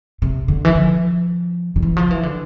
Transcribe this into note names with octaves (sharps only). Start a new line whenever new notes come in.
C3
D3
E3
F3
D3
E3
F3
E3
D3